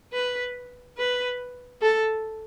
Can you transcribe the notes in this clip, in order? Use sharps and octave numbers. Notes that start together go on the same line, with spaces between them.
B4
B4
A4